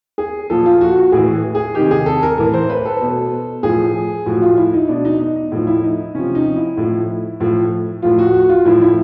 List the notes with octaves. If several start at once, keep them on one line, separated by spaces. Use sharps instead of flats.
G#4
A#2 F3 A4
F4
F#4
F#4
A2 E3 G#4
G#4
C3 D#3 G4
G#4
A4
A#4
A2 E3 A#4
C5
B4
A4
B2
A2 F3 G#4
A2 F3 F#4
F4
E4
D#4
B2 D4
D#4
D#4
D#4
A2 F3 D#4
E4
D#4
C3 F3 C#4
D#4
E4
A2 F3
A2 F3
A2 F3 F4
F#4
F#4
F4
A2 F3 E4
E4